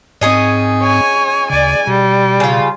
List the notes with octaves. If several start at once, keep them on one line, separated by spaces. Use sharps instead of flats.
G#2 C4 C#4 G#4 D#5
C#5 G#5
D2 C#3 D5 G#5
B2 G3
C#3 F4